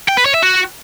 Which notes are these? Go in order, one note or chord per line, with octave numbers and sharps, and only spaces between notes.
G5
B4
C#5
E5
F#4